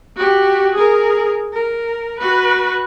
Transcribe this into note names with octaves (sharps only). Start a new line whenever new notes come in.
F#4 G4
G#4 A#4
A#4
F#4 B4